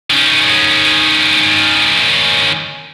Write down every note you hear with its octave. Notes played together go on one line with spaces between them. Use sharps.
D#3 C#4